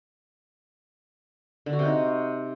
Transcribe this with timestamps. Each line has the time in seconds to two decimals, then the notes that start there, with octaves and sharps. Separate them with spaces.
1.66 D3
1.73 F#4
1.79 C3
1.85 D#4